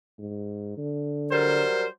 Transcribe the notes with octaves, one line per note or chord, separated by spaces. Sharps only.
G#2
D3
F#3 G3 A#4 C5